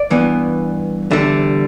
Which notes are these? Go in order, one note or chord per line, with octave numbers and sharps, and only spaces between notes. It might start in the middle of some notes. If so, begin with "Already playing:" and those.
Already playing: D5
G2 E3 B3
E2 D3 G3 E5